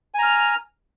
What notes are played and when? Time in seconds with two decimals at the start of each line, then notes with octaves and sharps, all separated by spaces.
0.14 G#5
0.19 A#5
0.23 F6